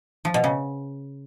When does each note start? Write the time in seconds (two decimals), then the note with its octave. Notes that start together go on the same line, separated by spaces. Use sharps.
0.25 F3
0.34 B2
0.44 C#3